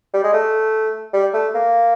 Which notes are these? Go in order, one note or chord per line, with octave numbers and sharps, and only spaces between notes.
G3
G#3
A3
G3
A3
A#3